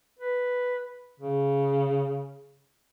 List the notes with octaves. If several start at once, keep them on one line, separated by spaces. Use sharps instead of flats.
B4
C#3